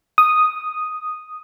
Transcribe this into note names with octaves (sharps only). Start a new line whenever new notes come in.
D#6